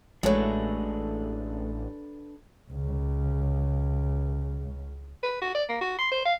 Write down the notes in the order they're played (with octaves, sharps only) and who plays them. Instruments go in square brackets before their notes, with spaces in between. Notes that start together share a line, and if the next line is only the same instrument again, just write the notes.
[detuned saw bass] A1 [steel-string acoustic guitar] G#3 A3 [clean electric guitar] D4 A4 B4 [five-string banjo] F#4 C#5
[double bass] C#2 C#3
[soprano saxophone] B4
F#4
D5
A#3
F#4
C6
C5
F5